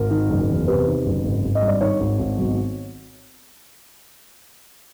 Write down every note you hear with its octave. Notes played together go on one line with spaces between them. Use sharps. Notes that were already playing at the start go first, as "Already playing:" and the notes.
Already playing: G#1 A#4
D#3
F#1
E2
C3 B4
D#3
F#1
G#1
G#1
D#5
G2
D5
D#3 C#5
G#1
G#1
B1